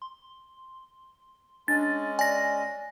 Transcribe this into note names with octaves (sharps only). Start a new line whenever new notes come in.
C6
G#3 C#4 D4 A6
D5 G#5 A#6